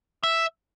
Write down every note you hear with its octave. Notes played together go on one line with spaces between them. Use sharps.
E5